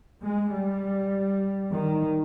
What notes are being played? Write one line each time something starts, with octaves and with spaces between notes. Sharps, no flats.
G#3
G3
D#3